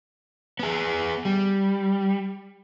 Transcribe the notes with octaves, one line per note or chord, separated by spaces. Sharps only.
B3 G#4
G3